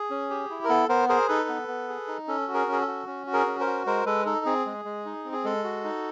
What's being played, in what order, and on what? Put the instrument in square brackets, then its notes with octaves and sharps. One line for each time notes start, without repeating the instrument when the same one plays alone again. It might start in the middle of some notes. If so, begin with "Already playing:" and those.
Already playing: [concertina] G#4
C#4
G4
E4
A#4
B3 A4
B3 A#4 C5
G#4 A#4 C5
D#4 A4 B4
B3
B3
G#4
D#4
C#4 A4
F#4
G#4 A#4
C#4
G#4
A4
F#4
C#4
F#4
G#4 A#4
C#4
A#4 C5
F#4
G#3 A#4 C5
G#3 A4 B4
D#4 A4
C4 G#4
G#3
G#3
D#4
C4
G#4
G#3 A4
F#4
D#4